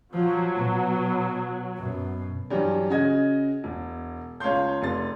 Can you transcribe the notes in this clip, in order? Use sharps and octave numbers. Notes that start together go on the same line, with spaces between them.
F3 F#3
B2
F#2 B2
G2 E3 F#3 G3
C#3 F#4 D#5 G#6
E1
C#2 C#5 F5 A5 C6 G6
F1 C6 A6